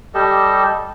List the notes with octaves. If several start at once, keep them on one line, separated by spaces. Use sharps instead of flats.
G3 G4 A4 D#5